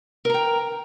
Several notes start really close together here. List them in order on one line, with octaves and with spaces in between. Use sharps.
A#4 A#5 G5